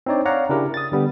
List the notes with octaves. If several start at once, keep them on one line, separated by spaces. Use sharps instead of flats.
C4 D4 D#4 C#5 D5
C#5 D5 F5 F#5 A#5
C#3 D4 E4 G4 A#4
D#6 A6
D3 G3 B3